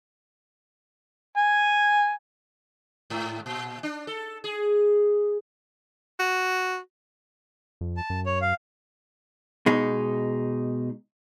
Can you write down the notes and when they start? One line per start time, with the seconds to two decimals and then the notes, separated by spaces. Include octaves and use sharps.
1.37 G#5
3.10 G#2
3.46 A#2
3.83 D4
4.07 A4
4.44 G#4
6.19 F#4
7.81 F2
7.97 A5
8.10 F#2
8.26 C#5
8.41 F5
9.66 B2 G#3 D#4